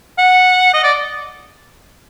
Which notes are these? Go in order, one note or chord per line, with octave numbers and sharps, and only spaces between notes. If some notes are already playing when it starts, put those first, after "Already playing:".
F#5
D#5
D5